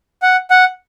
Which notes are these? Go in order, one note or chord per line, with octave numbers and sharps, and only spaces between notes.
F#5
F#5